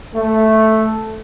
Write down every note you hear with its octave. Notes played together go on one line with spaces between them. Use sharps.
A3